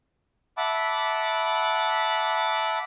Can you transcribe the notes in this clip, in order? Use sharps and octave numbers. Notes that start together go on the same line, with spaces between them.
E5 F#5 A5 B5 D6